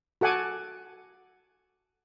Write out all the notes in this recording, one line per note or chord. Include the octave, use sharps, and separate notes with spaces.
F#4 A4 F#5 G#5 D6